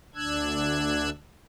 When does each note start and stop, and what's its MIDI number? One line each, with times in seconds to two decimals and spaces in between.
0.15 1.10 38
0.15 1.10 62
0.15 1.10 88
0.15 1.10 90
0.15 1.10 92